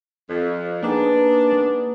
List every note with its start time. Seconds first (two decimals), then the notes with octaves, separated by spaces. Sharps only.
0.29 F2
0.83 A#3 B3 D4 D#4 G#4